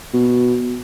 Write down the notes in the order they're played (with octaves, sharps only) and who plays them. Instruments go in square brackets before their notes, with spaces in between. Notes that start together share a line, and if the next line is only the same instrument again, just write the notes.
[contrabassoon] B2